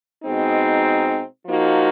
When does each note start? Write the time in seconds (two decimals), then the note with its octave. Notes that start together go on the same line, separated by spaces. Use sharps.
0.23 B2 G#3 C4 D#4
1.46 F3 A#3 D#4 F#4